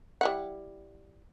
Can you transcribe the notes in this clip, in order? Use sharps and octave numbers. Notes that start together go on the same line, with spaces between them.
G3 E4 F#5